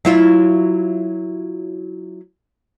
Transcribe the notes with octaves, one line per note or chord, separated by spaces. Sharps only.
F#3 E4 F4